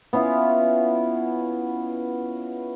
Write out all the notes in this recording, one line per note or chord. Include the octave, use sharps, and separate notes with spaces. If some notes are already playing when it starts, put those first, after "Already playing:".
B3 C#4 E4 F4